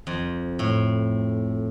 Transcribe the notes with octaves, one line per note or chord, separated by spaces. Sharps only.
F2
A2